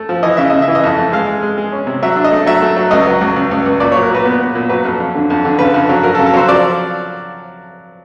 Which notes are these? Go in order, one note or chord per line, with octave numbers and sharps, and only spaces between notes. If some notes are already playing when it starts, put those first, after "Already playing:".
Already playing: A3
F3
E3 D#5
C#3 E5
C#3 D#5
E5
E3
D#5
F2
A3
G#3 F5
G#3
G#3
G#3
C#4
C3
F#3 E5
D4
D#5
A3
F#3 E5
A3
F#3
C#2 D#5
F#3
C#2
C#2
C#2
C#2
A#2 D5
F#3 C#5
A#4
A#2 B4
B3
B3
A#2
F#3 B4
F2
F2
D3
F2
D3
C#3 B4
F2
F#3
F#3 A#4
A4
C#3
A4
F#3 C5
F3 D5